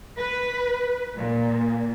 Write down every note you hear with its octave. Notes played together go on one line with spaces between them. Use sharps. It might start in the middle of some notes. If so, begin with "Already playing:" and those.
B4
A#2